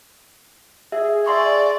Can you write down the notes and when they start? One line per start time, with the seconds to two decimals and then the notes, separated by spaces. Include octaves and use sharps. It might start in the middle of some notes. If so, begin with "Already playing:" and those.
0.92 G#4 E5
1.26 D5 E5 C6 C#6